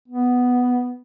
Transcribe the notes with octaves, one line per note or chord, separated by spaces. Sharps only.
B3